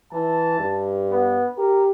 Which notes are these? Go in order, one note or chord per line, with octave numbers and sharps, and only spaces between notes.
E3 A5
G2
B3
G4 A#4